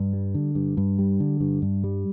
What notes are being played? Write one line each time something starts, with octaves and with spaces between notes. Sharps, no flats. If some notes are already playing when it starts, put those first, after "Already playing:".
Already playing: G2
G3
D3
G2
G2
G3
D3
G2
G2
G3